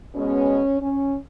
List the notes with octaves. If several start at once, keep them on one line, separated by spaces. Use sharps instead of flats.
B2 G#3 B3 C#4
C#4